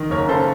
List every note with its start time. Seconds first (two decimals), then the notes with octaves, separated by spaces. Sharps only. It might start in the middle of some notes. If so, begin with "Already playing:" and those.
Already playing: D#3
0.10 F#1 A#4 C#5
0.28 C#3 A4 C5